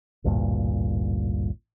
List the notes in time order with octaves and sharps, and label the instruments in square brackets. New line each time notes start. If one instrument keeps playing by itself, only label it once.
[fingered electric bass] A1 D2 G2 A#2